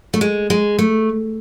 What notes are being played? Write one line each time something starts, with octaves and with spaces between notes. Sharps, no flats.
A3
G#3
G#3
A3